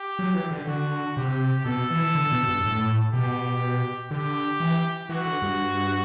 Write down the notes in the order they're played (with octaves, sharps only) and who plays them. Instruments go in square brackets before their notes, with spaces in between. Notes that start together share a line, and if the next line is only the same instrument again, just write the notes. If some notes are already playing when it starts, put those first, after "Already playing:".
Already playing: [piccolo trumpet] G4
[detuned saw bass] F#3
E3
D3
[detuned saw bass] D3 [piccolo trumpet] F#4
[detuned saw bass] C3 [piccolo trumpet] G4
[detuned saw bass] B2 [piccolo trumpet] A4
[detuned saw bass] E3
D3
B2
G2
A2
[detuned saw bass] B2 [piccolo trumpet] G4
[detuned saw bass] D3 [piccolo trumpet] G4
[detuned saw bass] E3
[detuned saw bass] E3 [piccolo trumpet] F#4
[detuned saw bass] D3
G2